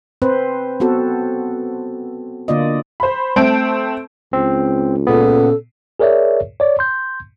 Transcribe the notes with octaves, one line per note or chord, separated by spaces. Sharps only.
C4 B4 C5
B3 C4 F#4 A4
D3 A#3 F4 D5 D#5
C5 B5
A3 C4 A5 D7
C#2 C4
A#2 C#3 B3 A4
G#4 A#4 C#5 D5 E5
C#5 D5
C6 G6